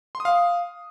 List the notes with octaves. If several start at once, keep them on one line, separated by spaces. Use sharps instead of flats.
C6
D#6
F5